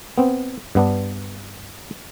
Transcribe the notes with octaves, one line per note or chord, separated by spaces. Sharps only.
B3 C4
G2 B3 D4